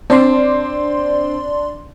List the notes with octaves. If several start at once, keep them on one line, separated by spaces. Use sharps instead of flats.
C4 D4 D5 C6